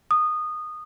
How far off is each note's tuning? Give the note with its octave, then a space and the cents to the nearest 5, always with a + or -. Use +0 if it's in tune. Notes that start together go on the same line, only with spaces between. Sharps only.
D#6 -15